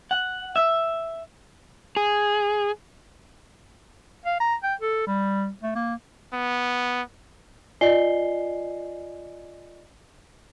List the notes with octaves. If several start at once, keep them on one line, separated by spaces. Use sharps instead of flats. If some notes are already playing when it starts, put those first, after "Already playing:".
F#5
E5
G#4
F5
A#5
G5
A4
G3
A3
A#3
B3
F4 D5 D#5 G#5 C7 G7